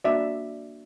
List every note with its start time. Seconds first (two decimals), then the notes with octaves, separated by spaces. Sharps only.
0.04 A#3 D4 F#4 D5 E5